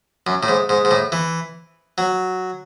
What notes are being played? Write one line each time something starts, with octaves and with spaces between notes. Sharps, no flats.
F#2
A2
G#2
G#2
G#2
A2
E3
F#3